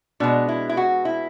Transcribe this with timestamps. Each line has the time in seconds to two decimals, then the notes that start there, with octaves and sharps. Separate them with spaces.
0.20 B2 G#3 D4
0.48 E4
0.69 E4
0.77 F#4
1.05 E4